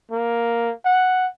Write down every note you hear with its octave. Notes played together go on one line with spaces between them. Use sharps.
A#3
F#5